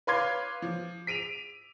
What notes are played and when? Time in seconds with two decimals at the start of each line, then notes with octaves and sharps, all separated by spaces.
0.07 B4 C#5 F5 C6 D6 G#6
0.62 F3
1.07 B6 D7 D#7 F7